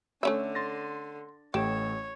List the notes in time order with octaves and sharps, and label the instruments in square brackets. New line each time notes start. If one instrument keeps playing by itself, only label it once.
[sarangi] D3 [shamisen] A3 C#4 E5
[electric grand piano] C6 A6 A#6
[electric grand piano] A1 A3 E7 [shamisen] G4 [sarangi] C#5